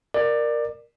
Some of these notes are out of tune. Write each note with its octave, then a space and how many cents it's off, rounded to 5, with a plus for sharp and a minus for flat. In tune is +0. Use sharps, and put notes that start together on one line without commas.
A#4 +0 D5 +20